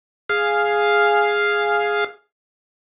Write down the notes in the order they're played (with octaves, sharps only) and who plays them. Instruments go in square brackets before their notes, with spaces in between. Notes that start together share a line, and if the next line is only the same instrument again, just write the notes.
[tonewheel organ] G#4 F5